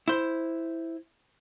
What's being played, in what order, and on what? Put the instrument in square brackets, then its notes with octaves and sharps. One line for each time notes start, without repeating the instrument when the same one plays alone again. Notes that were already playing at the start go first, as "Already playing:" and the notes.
[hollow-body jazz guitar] E4 C5